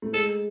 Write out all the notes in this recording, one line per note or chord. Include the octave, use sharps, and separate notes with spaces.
A3
G#3 A4